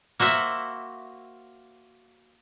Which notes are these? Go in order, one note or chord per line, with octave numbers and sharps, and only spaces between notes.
A#3 F#4 C5 E5